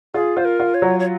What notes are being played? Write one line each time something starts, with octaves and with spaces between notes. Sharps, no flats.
F4 G#4
F4 C5
A#4
F4
C#5
F#3
C#5